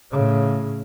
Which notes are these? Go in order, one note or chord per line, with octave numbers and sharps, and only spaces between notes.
A2 C#3